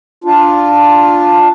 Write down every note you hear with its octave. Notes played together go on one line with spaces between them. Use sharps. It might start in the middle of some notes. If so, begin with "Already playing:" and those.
D4 F4